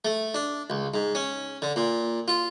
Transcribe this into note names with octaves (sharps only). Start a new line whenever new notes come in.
A3
D4
C#2
G#2
C#4
D3
A#2
F4